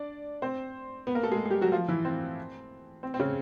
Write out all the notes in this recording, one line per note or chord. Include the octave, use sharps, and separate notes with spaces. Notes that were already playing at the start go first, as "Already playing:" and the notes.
Already playing: D4 D5
C4 C5
B3 B4
A#3 A#4
A3 A4
G#3 G#4
G#4
G3 G4
F#3 F#4
F3 F4
E3 E4
C4
C4
C4
C#3 C#4